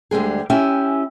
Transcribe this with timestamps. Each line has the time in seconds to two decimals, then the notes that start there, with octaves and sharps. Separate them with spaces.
0.11 D2 D3 G3 G#3 G#4
0.50 C#4 E4 G4 E5 G5 G#5